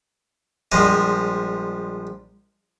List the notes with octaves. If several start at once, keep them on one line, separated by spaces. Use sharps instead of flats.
A#1 F3 G3 G#3 D#5